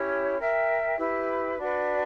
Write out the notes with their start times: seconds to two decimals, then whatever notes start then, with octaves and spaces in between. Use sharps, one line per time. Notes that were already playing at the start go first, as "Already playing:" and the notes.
Already playing: C#4 E4 G4 C#5
0.38 A#4 E5 G5
0.98 E4 G4 B4
1.57 D4 F#4 B4